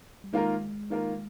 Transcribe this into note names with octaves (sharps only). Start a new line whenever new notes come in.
G3
D#3 G#3 A#3 F4 A#4
D#3 A#3 F4 A#4